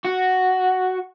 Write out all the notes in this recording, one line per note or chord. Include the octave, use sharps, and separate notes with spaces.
F#4